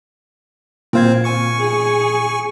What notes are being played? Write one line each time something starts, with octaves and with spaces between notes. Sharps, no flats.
A#2 C4 F4 C5 F5 G#6
G#5 C#6 C#7
G#4